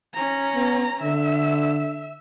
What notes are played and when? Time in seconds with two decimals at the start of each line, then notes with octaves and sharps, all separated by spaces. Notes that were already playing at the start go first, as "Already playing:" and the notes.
0.14 C#4 A#5
0.54 B3
1.02 D3 E5